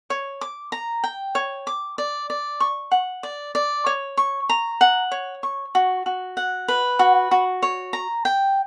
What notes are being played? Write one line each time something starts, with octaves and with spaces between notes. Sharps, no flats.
C#5
D6
A#5
G5
C#5
D6
D5
D5
C#6
F#5
D5
D5
C#5
C#6
A#5
F#5
C#5
C#6
F#4
F#4
F#5
B4
F#4
F#4
C#5
A#5
G5